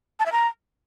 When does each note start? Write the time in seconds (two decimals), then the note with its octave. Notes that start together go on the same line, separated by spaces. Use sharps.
0.20 A5
0.26 E5
0.32 A#5